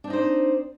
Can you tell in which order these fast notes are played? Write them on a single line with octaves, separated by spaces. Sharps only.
D4 C4 D#4 C5 D5